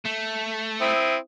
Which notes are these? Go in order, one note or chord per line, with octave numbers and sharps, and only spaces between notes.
A3
C4 E4 D#6